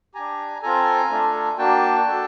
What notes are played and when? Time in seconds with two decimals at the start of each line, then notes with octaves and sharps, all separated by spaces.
0.15 D4 G4 G#5 A#5
0.62 C4 F4 A4 G#5 A#5
1.10 A3 D4 F4 A4
1.58 A#3 D4 F#4 G5 A5
2.07 D4 F#4 A4